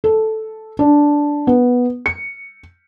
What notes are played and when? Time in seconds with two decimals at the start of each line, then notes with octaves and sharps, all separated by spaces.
0.04 A4
0.79 D4
1.47 B3
2.06 C#7